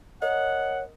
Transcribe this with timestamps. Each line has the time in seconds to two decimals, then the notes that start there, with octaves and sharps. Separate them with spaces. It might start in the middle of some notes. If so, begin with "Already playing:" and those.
0.22 A#4 C#5 D#5 F#5